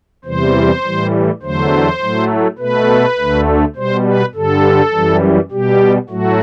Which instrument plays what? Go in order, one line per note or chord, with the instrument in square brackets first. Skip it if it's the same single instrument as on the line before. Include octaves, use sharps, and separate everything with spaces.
[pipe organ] E2 C3 E3 G3 C5
A2 E3 G3
E2 D3 F#3 A3 C5
A2 F#3 A3
B2 A3 B4
D2 D3 A3
B2 G3 C5
B4
G2 D3 G3 A4
F#2 E3 G3
B2 G3 G4
A2 F#3 A3 F#4